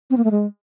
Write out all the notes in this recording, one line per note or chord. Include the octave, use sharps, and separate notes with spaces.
C4
A#3
A3
G#3